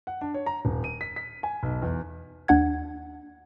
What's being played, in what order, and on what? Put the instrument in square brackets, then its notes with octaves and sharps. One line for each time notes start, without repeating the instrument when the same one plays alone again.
[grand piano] F#5
D4
C#5
A#5
D#1
D#7
B6
B6
G#5
B1
E2
[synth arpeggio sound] D#2 D4 F#5 G#6